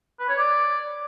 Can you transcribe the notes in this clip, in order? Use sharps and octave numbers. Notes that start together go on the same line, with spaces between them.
B4
C#5
D5